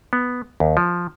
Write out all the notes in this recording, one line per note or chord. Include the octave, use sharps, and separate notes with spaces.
B3
D#2
F3